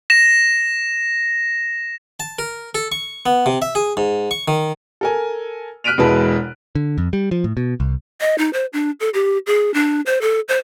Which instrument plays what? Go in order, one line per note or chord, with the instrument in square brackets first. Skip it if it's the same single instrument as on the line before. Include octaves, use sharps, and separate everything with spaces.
[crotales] A#6 E7
[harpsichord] A5
A#4
A4
C#6
B3
C3
E5
G#4
G#2
C#6
D#3
[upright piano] A4 A#4 G#5
F6 F#6 B6 D7 D#7 F7
E1 B2 G#3 E4 B4 A5
[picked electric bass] D3
F2
G3
F3
A2
B2
C2
[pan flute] D#5
D#4
C5
D4
A4
G4
G#4
D4
C5
A4
C5